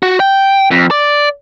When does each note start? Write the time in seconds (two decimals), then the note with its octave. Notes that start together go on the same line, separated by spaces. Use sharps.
0.03 F#4
0.20 G5
0.71 F2
0.91 D5